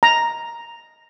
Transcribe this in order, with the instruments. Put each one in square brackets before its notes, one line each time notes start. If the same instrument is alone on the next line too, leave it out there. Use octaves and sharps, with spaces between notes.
[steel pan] A#5